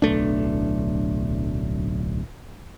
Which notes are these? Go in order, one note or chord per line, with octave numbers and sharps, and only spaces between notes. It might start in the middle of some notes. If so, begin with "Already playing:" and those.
D1 B1 A3 D4